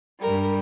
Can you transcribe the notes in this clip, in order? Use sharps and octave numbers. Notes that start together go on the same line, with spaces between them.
G2 G3 A#4